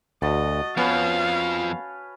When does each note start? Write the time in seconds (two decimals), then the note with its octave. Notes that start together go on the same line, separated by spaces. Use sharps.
0.22 D2 F#4 D#5 A5
0.77 F2 F3 B3 C#4 B4 F5